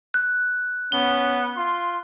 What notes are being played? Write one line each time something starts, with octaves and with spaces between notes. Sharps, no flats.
F#6
B3 C#4 G7
F4 C6